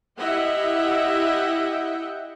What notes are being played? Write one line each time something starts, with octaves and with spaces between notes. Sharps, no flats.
E4 G4 D#5 E5 F#5 G5